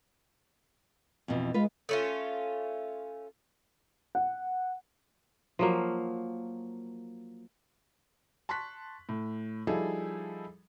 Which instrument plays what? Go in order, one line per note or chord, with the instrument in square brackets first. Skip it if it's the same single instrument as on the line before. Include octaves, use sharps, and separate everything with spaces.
[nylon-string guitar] F2 B2 E3
[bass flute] G#3 [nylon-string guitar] F4 B4
[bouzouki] A3 C#4 F4
[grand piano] F#5
[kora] F3 F#3 A#3
[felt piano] A5 C6 C#6 F#6 B6
A2
F3 G3 D#4 E4 G#4 A4